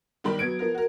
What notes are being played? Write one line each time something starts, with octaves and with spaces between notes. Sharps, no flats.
G1 D#3 G3 G4 B5
F#3 B3 G#6 D7
F3 B3 A#4
F#4 A#4